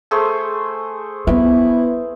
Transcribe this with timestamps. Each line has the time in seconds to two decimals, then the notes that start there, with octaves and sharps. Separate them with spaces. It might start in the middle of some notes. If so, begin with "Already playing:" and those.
0.11 A3 G#4 C5
1.27 B3 E4 B4